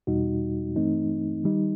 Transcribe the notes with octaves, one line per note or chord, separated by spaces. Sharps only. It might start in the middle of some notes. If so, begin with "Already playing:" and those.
E2 B2 G3 D#4 F#4
G2 E3 A3 C4 D#4
D#3 G3 D#4